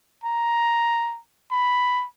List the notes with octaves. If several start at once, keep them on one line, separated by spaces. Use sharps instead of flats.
A#5
B5